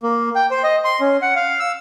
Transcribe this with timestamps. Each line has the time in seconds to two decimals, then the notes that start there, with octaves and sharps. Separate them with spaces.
0.03 A#3
0.35 G5
0.51 C5
0.63 D#5
0.85 C6
1.00 C#4
1.22 F#5
1.36 F5
1.60 E6